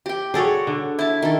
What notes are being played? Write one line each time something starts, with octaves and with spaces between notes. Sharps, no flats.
G4 G5
F#4 G#4 A4 C#5 D5
D3
E4 A5
D#3 A4